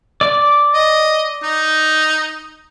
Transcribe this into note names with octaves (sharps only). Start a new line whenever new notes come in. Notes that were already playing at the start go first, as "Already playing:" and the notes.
D5 D6
D#5
D#4